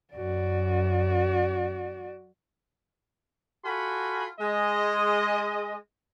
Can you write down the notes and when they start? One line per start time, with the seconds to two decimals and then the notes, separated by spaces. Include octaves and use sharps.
0.14 F#2 F#4 D5
3.65 F4 F#4 A4 G#5 B5
4.40 G#3 D#5